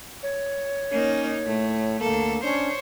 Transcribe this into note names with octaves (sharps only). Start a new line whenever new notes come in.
C#5
A#3 C#4 D#4
A2 A3
D2 A#3 A4
C#4 D4 C5 C#5